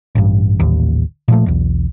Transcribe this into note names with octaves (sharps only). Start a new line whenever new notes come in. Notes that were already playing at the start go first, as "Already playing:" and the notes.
A1 G2
D#1 A1 D#2
A#2 F3 A3
B1 E2